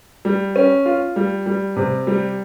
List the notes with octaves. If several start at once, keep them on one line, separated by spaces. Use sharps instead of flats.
G3
C#4
F4
G3
G3
C3
G3